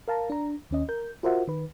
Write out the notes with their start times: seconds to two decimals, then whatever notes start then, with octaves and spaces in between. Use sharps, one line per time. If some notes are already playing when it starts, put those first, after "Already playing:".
0.08 A#4 F5 A5 A#5
0.30 D4 A#5
0.71 D#2 C#4 D#5
0.89 A#4 G6
1.23 F4 F#4 A#4 C5 E5 F#5
1.48 D#3 B4